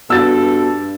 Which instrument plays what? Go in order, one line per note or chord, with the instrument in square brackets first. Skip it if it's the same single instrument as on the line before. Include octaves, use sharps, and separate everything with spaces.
[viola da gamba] G2 [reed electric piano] B3 F#4 [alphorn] A4 [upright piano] E6 A6